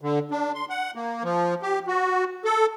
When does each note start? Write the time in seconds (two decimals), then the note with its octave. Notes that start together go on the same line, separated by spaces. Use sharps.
0.01 D3
0.31 D4
0.55 C6
0.70 F#5
0.95 A#3
1.24 F3
1.62 G4
1.87 F#4
2.45 A4